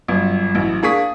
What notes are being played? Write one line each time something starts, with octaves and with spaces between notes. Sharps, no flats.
G1 F#2
A1 F#2
A#3 D4 G#4 C#6 D#6 B6